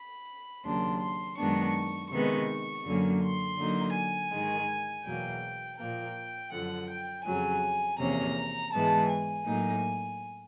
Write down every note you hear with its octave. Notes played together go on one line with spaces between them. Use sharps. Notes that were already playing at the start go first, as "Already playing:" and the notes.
Already playing: B5
D#2 C#3 F#3 A#3 D4 C6
C6
F#2 D#3 G#3 B3 D4 C#6
C3 D#3 G#3 B3 C#6
F#2 D3 F#3 A#3 C#4
C6
D3 F#3 A#3 D#4
G#5
G#2 D#3 G#3
E2 B2 F#3 A#3 G5
A#2 F3 A#3 G5
F#2 D3 F3 F#5
G5
F2 C#3 F#3 G#5
E2 C3 F3 A#3 C#4 A#5
G#2 E3 G#3 B3 A5
G#5
A2 F#3 A#3 D#4